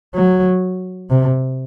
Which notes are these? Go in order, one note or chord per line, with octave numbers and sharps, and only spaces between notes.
F#3
C3